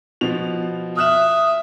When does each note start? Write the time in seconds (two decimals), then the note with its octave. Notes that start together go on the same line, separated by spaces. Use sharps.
0.21 B2 F3 F7
0.97 E5 D#6 F6 F#6 E7